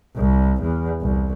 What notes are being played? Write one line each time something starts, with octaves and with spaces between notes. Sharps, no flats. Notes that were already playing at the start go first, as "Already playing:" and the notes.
C2
E2
C2